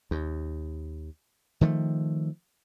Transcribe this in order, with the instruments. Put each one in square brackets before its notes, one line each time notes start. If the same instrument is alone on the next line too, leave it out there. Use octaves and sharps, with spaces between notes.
[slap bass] D#2
D#3 F3 G#3 A3